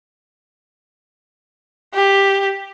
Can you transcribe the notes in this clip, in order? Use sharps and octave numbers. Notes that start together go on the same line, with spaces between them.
G4